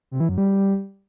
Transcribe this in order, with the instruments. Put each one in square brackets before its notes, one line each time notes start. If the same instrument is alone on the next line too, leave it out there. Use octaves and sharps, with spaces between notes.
[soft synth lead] C3
E3
F#2
G3